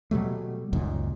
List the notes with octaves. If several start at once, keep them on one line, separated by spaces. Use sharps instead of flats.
B2 F#3 G3 A3
C#2 F#2 A#2 D#3